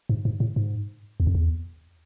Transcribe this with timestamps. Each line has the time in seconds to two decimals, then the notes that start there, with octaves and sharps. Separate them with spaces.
0.09 G#2
0.25 G#2
0.40 A2
0.56 G#2
1.20 E2
1.27 F2
1.35 E2